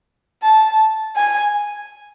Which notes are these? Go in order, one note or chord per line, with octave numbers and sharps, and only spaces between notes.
A5
G#5